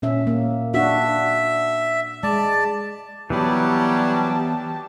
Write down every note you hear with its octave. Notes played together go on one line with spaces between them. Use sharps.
A#2 C#4 E5
A#3
D4 F#4 E5
G#3 D5 A5
E3 F#3 G3 B3 G4 A5 B5